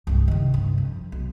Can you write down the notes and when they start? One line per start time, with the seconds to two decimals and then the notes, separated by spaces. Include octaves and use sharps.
0.07 C2 G2
0.28 C3 D#3
0.54 G2
0.78 F2
1.12 B1